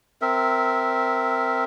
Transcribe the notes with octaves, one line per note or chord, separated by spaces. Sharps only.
C4 A#4 E5